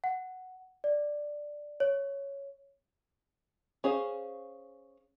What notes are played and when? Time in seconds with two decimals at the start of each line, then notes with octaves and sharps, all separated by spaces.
0.04 F#5
0.84 D5
1.80 C#5
3.84 C#4 G#4 C5 F5